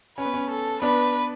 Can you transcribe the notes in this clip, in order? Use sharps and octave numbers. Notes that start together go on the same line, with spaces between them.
C#4 B4
B3
C#4
A4
B3 D4 B4